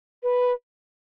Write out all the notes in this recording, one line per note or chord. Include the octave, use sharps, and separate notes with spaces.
B4